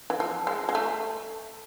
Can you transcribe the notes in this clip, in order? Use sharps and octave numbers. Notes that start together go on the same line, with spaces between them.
E3
F3
G#3
G#3
A3